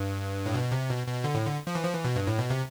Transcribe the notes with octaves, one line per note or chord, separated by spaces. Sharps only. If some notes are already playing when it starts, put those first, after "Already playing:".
Already playing: G2
A2
B2
C3
B2
B2
D3
A2
D3
F3
E3
F3
E3
B2
G2
A2
B2
C3